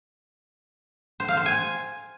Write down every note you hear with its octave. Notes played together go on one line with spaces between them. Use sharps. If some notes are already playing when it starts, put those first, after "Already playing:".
C5
F5
C5
G#5